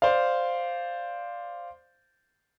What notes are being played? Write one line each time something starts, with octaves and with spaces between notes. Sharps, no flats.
C5 D5 F5